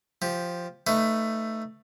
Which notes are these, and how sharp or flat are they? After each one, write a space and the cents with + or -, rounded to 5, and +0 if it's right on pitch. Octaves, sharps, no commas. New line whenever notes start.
F3 +0 G4 +0
A3 +10 D#4 +0 B4 +20